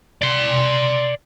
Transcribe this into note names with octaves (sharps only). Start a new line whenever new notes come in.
D5 C6